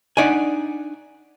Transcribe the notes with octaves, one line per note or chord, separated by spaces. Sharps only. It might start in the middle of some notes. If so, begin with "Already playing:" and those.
D4 D#4 D5 F#5 G#5